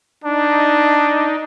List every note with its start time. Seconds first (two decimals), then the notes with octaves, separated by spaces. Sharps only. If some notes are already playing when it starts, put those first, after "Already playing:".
0.24 D4 D#4